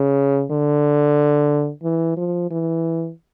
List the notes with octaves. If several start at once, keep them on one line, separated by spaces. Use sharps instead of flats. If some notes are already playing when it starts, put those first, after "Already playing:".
Already playing: C#3
D3
E3
F3
E3